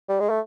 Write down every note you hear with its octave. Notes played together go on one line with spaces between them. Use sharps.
G3
G#3
A3